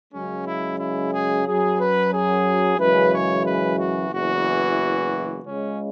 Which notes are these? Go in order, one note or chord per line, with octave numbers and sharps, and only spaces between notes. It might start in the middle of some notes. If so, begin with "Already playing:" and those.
F#2 C#3 G#3 C#4
E4
E4
G#4
F#2 F#3 G#4
B4
G#4
F#2 C#3 E3 G#3 B4
C#5
B4
F#4
F#1 E2 E3 F#4
C#2 C#3 G#3 C#4